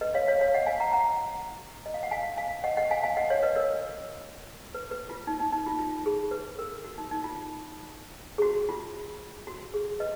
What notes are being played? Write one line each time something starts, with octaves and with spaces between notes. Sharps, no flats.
B4 D#5
C#5 F5
C#5 F5
C#5 F5
D#5 F#5
F5 G#5
F#5 A#5
F#5 A#5
D#5
F5
F#5
F5 G#5
F5 G#5
D#5 F#5
D#5 F#5
F5 G#5
F5 G#5
D#5 F#5
C#5 F5
B4 D#5
A#4 C#5
B4
B4
F4
D#4
D#4
D#4
F4
F4
G#4
B4
A#4
F#4
D#4
D#4
F4
G#4
F#4
F4
F#4
G#4
B4 D#5